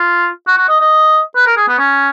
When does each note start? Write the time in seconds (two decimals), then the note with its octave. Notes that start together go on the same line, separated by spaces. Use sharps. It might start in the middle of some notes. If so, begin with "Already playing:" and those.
Already playing: F4
0.48 F#4
0.58 F#4
0.69 D#5
0.81 D#5
1.36 B4
1.46 A#4
1.57 G#4
1.69 B3
1.79 C#4